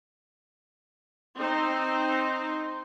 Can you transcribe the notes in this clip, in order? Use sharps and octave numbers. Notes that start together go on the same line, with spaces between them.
C4 D#4 C5